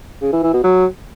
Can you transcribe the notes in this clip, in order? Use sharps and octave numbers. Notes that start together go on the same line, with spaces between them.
C#3
E3
E3
B2
F#3